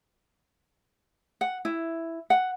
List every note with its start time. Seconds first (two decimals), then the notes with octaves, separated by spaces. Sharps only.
1.41 F#5
1.65 E4
2.30 F#5